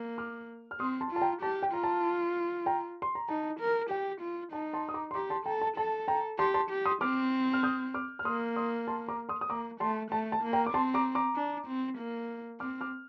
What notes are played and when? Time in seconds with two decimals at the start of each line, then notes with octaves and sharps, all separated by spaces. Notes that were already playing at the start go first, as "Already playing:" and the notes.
Already playing: A#3
0.18 D6 F6
0.71 F6
0.80 C4 C6 D#6
1.01 A5 C6
1.11 F4 A5
1.21 G5 A#5
1.42 G4 A5
1.63 G5
1.73 F4 A#5
1.83 A5
2.66 G5 A#5
3.02 C6
3.15 A#5
3.29 D#4 A5
3.60 A#4
3.90 G4 G5
4.22 F4
4.53 D#4 A5
4.73 A5 C6
4.89 D#6
4.94 A#5 D6
5.11 C6
5.15 G4 A#5 D6
5.30 A5 C6
5.46 A4 G5 A#5
5.62 A5
5.77 A4 A5
6.08 G5 A#5
6.39 G4 A5 C6
6.54 A5 C6
6.70 G4
6.86 C6 D#6
7.01 C4 D6 F6
7.53 F6
7.63 D#6 G6
7.94 D6 F6
8.19 F6
8.25 A#3 C6 D#6
8.56 C6 D#6
8.88 A5 C6
9.08 A#5 D6
9.29 C6 D#6
9.41 D#6
9.49 A#3 A#5 D6
9.80 A3 A5 C6
10.11 A3 A5
10.32 A5
10.43 A#3
10.53 G5 A#5
10.66 D6
10.73 C4 A5 C6
10.94 A#5 D6
11.15 A#5 D6
11.36 D4
11.67 C4
11.98 A#3
12.60 C4 D6 F6
12.81 D6 F6